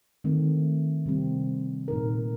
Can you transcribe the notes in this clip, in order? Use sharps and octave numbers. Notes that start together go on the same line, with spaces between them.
D#3 A3 C4
C3 G3 C4
A#2 A3 D#4 A#4